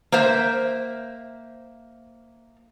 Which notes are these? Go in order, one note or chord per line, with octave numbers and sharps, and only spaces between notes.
A#3 C5 E5